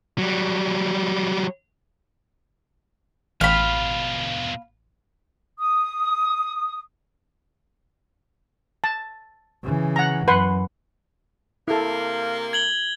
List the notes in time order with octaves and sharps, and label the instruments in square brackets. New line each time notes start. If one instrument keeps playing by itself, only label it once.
[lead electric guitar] F#3 G3
[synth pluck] A1 G5 [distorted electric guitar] B2 F4 [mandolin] F5 B5
[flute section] D#6
[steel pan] A5
[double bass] C#3 E3
[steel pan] F#5 A#5
[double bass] F#2 [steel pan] B4 F#5 C6
[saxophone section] C3 A#3 [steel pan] E4 A4
[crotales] G#6 F#7 G7